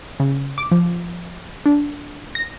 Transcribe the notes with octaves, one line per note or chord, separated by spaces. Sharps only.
C#3
D6
F3
D4
A#6